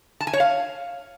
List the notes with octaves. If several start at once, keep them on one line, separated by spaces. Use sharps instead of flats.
A5
G#5
C#5
F5